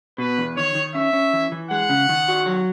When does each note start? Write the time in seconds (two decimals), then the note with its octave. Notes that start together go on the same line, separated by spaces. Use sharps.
0.18 B2 B4
0.38 E2
0.57 D#3 C#5
0.75 D#3
0.94 C#4 E5
1.13 C#4
1.33 E3
1.52 E3
1.71 G#3 F#5
1.89 C#3
2.09 D#3
2.28 F#4
2.46 F#3